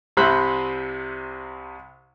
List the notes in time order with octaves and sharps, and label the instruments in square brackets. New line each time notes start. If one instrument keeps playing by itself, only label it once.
[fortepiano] C2 C3 C5 E5 B5 F#6